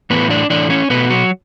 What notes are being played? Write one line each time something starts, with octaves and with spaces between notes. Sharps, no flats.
A2 E3 A3 B3 B4
D4 D5
A2 E3 A3 D4 D5
C#4 C#5
B2 A3 B3 B4
F#3 F#4